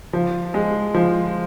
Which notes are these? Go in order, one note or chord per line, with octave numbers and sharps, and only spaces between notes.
F3
G#3
F3